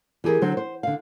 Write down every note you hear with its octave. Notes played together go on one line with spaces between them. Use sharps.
E3 G4 G#4 A#4
D3 F#3 C5
C5
D3 F5